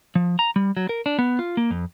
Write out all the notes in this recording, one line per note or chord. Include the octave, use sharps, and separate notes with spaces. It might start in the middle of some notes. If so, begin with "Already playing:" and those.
F3
A#5
G3
F#3
A#4
D4
B3
F4
A#3
F2